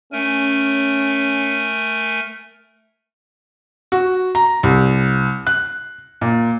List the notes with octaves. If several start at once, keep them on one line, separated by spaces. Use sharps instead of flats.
A3 C#4 A#4 G#5
F#4
A#5
C2
F#6
A#2